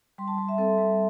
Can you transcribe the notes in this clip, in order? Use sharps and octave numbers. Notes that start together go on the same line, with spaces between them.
G3 C6
A5
G3
E5
C4 A4
G3